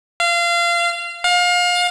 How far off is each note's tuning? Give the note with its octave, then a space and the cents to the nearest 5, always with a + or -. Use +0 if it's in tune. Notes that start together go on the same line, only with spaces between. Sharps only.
F5 -25
F5 +30